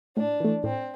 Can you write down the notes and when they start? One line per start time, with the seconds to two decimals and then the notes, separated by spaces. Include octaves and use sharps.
0.16 A2 D4
0.40 E3 A3
0.63 A2 C4